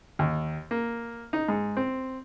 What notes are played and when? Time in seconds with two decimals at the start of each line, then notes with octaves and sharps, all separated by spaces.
0.19 D#2
0.71 A#3
1.33 D#4
1.49 G#2
1.77 C4